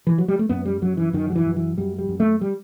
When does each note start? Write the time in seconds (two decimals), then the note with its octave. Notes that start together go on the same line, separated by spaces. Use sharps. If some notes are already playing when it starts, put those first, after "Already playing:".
0.07 E3
0.18 F#3
0.28 G3
0.39 A3
0.49 F#2 B3
0.65 G3
0.82 F#2 F#3
0.97 E3
1.13 F#2 D#3
1.30 F#3
1.36 E3
1.46 F#2
1.56 E3
1.78 F#2 G3
1.98 G3
2.09 F#2
2.20 A3
2.41 G3